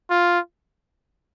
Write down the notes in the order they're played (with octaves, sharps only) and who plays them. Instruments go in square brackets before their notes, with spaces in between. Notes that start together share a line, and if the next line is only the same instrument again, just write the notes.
[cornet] F4